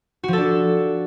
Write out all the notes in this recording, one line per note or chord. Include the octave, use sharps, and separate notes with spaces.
F3 D4 F#4 A4